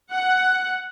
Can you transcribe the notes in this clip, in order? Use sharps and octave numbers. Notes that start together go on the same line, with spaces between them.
F#5